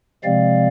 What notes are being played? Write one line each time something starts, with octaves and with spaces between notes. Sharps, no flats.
C3 F3 G#3 C4 D5 F5